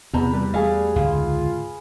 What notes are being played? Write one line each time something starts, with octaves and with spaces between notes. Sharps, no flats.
E2 C3 A#5 B5
G3 B4
A3 G#4 F5
C#2 G#2 D3 F4